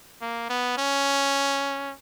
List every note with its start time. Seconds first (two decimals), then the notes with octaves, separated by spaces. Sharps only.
0.22 A#3
0.49 B3
0.78 C#4